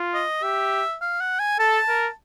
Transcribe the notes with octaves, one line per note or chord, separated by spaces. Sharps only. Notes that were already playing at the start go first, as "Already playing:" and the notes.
Already playing: F4
D#5
G4 E5
F5
F#5
G#5
A4 A5
A#4